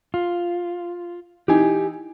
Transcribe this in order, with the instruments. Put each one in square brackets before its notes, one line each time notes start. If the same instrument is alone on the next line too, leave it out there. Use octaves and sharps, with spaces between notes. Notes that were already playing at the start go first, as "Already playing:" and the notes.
[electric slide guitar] F4
[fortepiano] E3 D#4 [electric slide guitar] G4 G#5